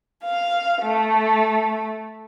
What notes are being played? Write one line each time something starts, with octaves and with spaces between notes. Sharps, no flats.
F5
A3